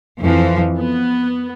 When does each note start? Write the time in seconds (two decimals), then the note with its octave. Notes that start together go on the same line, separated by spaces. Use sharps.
0.19 F2 E3 F3
0.77 B3